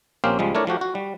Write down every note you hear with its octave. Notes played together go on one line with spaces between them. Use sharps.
A#1 A#3 C4 C#4 G4 F5
C#2 F3 G3 G#3
A3 D4 E4 A#4 C#5 D5
F3 A3 F#4 G4
F#4
G3